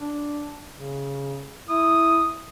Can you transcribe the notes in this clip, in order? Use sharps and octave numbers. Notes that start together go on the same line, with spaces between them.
D4
C#3
E4 D#6